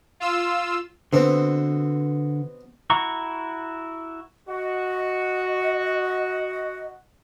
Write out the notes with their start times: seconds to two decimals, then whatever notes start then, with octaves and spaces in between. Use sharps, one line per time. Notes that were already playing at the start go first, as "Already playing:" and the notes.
0.20 F4 E6
1.13 B2 D3 C4
2.90 E4 F#4 A#5 C#6
4.48 F#4 D#5